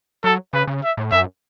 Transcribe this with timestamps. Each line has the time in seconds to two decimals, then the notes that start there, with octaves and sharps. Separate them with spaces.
0.24 F#3 A4
0.53 C#3 B4
0.67 C#3
0.83 E5
0.97 A2
1.12 F#2 E5